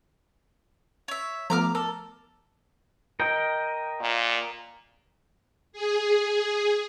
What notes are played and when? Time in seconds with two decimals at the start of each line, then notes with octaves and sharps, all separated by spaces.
1.08 C#5 E5
1.50 F3 A3 B3 A#5 D6 F6
1.75 A4 A#4
3.20 A#4 D#5 G5
4.01 A#2
5.72 G#4